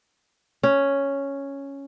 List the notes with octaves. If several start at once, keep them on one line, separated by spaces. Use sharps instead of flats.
C#4